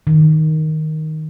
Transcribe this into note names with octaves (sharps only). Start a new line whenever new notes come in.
D#3